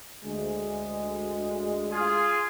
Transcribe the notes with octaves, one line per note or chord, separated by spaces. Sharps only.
D2 G#3
F4 G#4